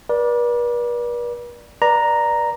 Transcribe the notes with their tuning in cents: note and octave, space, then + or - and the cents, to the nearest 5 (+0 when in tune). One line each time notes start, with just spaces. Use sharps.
B4 -45 D5 +0
B4 -30 D5 +5 A#5 +0